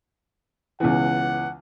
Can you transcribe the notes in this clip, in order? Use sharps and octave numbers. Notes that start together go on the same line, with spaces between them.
C#2 B2 E3 F#5